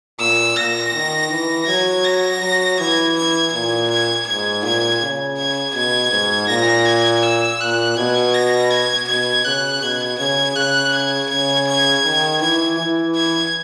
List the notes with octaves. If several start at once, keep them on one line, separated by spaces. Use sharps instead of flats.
A#2 E6
A#2 A#6
D#3
E3
F#3 G#6
A#6
F#3
E3 G#6
G#6
A#2 G#6
G#6
G#2 G#6
A#2 G#6
C#3
G#6
B2 G#6
G#2
A#2 A#6
G#6
E6
A#2 F#6
B2 G#6
A#6
G#6
B2 G#6
C#3 F#6
B2 G#6
C#3 G#6
C#3 F#6
G#6
C#3 G#6
G#6
D#3
E3 G#6
E3
G#6